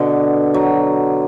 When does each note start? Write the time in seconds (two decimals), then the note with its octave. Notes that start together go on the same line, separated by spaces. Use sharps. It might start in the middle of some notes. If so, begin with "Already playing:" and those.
Already playing: B2 D3
0.54 F#3